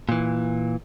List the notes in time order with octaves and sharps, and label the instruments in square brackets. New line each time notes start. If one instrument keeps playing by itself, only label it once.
[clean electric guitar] A#2 E3